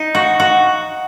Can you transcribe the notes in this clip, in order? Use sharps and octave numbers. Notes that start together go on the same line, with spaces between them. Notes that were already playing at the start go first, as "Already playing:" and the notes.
Already playing: D#4
F#4
F#4